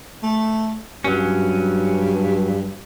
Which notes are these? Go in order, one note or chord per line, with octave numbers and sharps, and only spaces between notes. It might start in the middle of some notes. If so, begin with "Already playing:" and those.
A3
G2 F#3 C#4